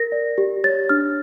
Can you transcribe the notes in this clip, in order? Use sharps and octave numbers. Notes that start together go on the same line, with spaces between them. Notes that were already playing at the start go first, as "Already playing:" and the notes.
Already playing: A#4 A#6
D5
G4
C#5 A6
D4 F6